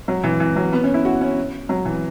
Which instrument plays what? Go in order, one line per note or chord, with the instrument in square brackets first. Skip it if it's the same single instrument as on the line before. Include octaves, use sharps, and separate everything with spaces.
[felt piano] F#3
E3
E3
F#3
B3
C#4
E4
F#4
C#4
F#3
E3